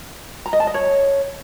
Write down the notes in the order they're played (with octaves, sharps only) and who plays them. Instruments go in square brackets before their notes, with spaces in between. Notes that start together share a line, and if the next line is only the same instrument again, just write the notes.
[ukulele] A#5
D#5
A5
D#5
C#5